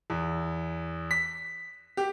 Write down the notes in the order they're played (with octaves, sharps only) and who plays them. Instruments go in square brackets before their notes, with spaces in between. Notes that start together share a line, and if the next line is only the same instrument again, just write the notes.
[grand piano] E2
B6
G4